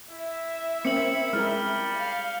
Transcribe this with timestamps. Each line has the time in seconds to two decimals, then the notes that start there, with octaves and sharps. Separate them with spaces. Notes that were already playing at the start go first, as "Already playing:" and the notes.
0.10 E4 E5
0.85 A#3 C4 C#4 C#7 F#7
1.33 G3 G#3 E4 A#4 F6
1.94 F5